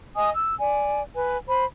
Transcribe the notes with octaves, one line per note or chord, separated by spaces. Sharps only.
D#5 G#5 D#6
E6
D5 G#5
B4 G#5
C5 B5